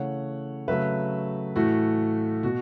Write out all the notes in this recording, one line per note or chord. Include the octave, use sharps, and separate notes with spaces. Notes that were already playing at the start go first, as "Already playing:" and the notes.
Already playing: C#3 E3 A3 C#5 F#5
C#3 F#3 A3 B4 E5
A2 E3 A3 F#4
B2 F#4